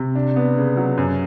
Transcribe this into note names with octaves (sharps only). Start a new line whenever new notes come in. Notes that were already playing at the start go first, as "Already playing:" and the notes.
Already playing: C3
D4
B3
C#3
F#3
F#2